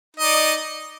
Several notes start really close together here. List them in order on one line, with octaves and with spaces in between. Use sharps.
D#4 D#5 D5